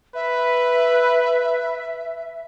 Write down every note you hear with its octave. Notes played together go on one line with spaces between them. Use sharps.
B4 E5